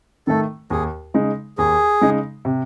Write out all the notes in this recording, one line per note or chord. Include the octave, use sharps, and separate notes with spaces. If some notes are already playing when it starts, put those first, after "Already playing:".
D#3 A3 A4
D#2 G#4
C#3 G#3 D#4
D#2 G#4
C#3 G#3 D#4
C3